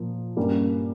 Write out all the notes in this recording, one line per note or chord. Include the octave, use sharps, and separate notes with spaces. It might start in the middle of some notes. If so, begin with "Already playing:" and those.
Already playing: A#2 F3 A#3
G2 G3 A#3 C#4